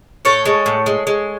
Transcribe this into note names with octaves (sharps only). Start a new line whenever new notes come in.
A2 A4 C#5
G#3
A2
G#3
G#3